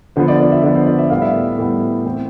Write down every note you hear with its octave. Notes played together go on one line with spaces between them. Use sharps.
D3 F3 B3 C5
D5
D5
E5
D3 F3 B3 D5
C5
D5
E5
A2 G3 B3 F5
E5
A2 G3 B3
E3 A3 C4 C5